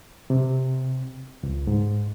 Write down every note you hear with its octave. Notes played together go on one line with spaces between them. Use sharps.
C3
C#2
G#2